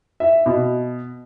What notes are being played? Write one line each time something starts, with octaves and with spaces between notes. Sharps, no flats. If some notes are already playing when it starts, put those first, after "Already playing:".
E5
B2